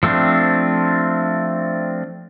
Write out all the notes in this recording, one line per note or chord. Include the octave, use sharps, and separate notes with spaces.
F3 A3 C4 D4